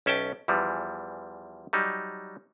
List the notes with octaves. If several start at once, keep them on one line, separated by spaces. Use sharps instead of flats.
B1 C#4 E5 G5 A5
E2 E3 F3 G3
F#3 G3 D#4